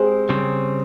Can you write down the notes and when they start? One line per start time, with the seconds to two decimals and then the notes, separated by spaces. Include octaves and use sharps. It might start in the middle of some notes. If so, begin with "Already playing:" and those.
Already playing: G#3 C4 G4 G#4 C5
0.29 C#3 G3 C4